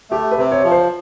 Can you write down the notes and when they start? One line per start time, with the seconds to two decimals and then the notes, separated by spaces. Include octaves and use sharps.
0.11 A3 G4
0.31 B4
0.38 C3
0.52 C#5
0.64 F3
0.71 C5